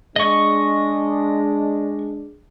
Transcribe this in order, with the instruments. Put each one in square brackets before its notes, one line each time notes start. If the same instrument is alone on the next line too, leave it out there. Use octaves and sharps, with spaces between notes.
[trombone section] G#3 D4 [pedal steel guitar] D#5 C#6